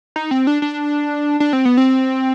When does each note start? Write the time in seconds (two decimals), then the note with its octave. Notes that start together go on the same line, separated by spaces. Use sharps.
0.16 D#4
0.31 C4
0.47 D4
0.62 D4
1.40 D4
1.53 C4
1.65 B3
1.77 C4